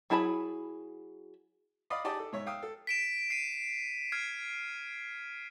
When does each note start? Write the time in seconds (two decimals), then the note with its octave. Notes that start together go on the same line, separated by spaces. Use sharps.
0.10 F#3 E4 G#4 A5 B5
1.90 D5 D#5 F5 B5 D#6
2.04 D#4 G4 G#4 D5 D#5 A5
2.19 A4
2.33 G#2 C#5 E5
2.46 F5 G5 D#6 E6
2.62 A4
2.87 B6 D7 E7
3.30 C7 D#7
4.12 F6 G#6 C7